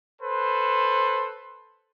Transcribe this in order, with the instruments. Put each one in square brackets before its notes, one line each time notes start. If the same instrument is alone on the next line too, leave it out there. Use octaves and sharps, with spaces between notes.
[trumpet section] A4 B4 C5